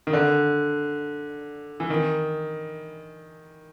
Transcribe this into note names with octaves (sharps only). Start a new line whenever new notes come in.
D#3
D3
E3
D#3